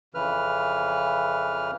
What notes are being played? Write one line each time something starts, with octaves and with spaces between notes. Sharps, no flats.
F2 C#3 E3 B4 F6